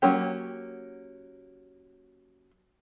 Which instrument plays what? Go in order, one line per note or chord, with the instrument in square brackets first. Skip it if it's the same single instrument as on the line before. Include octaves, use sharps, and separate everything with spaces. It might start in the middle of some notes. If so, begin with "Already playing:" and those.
[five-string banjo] F#3 A#3 C#4 G4